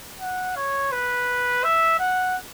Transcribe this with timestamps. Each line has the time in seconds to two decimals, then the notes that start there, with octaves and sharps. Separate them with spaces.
0.21 F#5
0.56 C#5
0.92 B4
1.64 E5
1.99 F#5